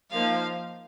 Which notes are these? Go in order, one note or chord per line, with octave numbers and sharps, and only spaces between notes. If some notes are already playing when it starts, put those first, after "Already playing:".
F3 A#3 D#4 F5